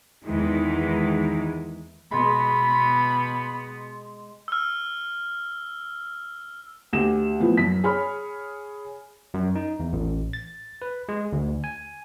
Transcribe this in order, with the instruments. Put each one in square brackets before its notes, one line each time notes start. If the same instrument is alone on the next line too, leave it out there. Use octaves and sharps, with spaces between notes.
[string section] E2 D#3 E3 G#3
[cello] B2 B3 [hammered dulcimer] G#3 [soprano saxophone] B5
[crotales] E6 F6
[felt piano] D2 G4 E7
A2 F3 B3
F#2 B6
G#4 C#5 B5 F6
[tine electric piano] F#2
D#4
E2
A1
A6
B4
G#3
D2
G#5